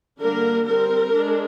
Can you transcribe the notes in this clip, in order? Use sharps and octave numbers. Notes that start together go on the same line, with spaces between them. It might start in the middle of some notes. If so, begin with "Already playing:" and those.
D3 G3 A#3 D4 A#4
G3 C4 A#4
G#3 D4